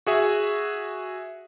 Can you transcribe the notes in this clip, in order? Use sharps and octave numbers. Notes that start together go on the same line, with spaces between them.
F#4 G#4 E5